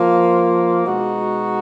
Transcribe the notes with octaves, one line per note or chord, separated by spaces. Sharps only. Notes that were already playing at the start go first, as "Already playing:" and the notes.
Already playing: F3 A#3 F4
B2 G#3 D#4 F#4